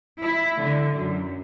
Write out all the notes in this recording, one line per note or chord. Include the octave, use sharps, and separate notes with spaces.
E4
D3
F#2